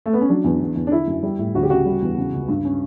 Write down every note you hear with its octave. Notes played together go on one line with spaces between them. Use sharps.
A3
B3
C#4
F#3 D4
E2
E2
E2
D4
D3 E4
F#2
G3
A2
D2 F#4
G4
C#3 F#4
G3
E2
C#3
C#2
G2
C#4